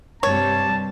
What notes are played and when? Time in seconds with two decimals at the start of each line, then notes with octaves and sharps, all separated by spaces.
0.23 G2 C3 G3 C#5 A5